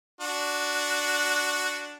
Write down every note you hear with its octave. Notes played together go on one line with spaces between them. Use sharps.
D4 F#4